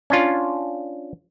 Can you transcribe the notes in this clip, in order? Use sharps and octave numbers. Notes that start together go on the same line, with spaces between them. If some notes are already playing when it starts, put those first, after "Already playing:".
C#4 D4 F4